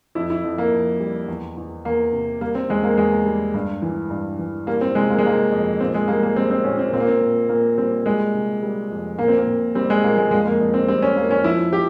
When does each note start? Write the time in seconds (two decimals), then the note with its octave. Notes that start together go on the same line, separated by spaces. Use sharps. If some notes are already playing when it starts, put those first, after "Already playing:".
0.15 F2 E4
0.30 E4
0.44 F2
0.58 A#3
0.72 F2
1.00 G3
1.28 E2
1.57 E2
1.85 E2 A#3
2.13 C3
2.41 G3 A#3
2.55 C4
2.69 E2 G#3
2.84 A#3
2.97 E2 G#3
3.26 G3
3.54 G2
3.82 E3
4.10 G2
4.39 E3
4.67 G3 A#3
4.81 C4
4.95 C3 G#3
5.10 A#3
5.18 G#3
5.24 C3 A#3
5.52 F2
5.80 A#2 C4
5.94 G#3
6.08 G3 A#3
6.23 A#3
6.36 G3 C4
6.51 C4
6.64 A#2 C#4
6.79 C4
6.93 A#2 C4
7.00 A#3
7.07 C4
7.21 A#2
7.49 A#2 A#3
7.78 G3 C4
8.06 G3 G#3
8.34 C3
8.63 G3
8.91 F2
9.18 A#2 A#3
9.28 C4
9.38 A#3
9.47 A#2
9.75 G3 C4
9.90 G#3
10.03 A#2 A#3
10.18 G#3
10.31 F2 G#3
10.46 A#3
10.61 F2
10.74 C4
10.88 G3 C4
11.02 C#4
11.16 F2 A#3
11.31 C#4
11.44 F3 E4
11.72 F3 G4